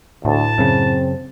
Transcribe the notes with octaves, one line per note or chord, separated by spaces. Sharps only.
D2 A2 A5
F#2 C#3 C4